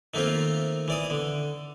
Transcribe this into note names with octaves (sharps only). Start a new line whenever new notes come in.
D#3 A3 A#3 C4 F4
E3 D5 D#6
D3